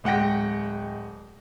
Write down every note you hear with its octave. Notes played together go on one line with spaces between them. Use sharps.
D1 G#3 F#5 G5 A#6